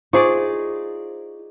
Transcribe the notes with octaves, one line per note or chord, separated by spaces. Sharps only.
D#4 F4 G#4 C5 D5 C#6